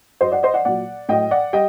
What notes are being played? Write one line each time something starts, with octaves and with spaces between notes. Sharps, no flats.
F#2 F#3 C5 D#5
D5 F#5
C5 D#5
D5 F#5
A#2 F#3 D5 F#5
A2 F#3 D#5 G5
D5 F#5
G3 D#5 G5